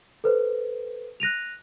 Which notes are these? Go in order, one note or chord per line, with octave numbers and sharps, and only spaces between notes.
A4 B4 C5
F#6 A#6 D#7 F7